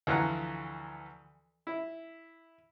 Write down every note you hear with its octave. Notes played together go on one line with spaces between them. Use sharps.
D2 E3 F3 F#5 A#5
E4